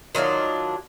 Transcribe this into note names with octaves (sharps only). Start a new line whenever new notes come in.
D#3 F#3 D4 F4